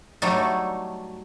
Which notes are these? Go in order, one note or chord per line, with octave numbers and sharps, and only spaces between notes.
F#3 G3 A3 D#4 A4